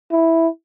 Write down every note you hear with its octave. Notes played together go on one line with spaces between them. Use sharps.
E4